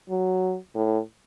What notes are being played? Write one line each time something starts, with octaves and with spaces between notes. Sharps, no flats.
F#3
A2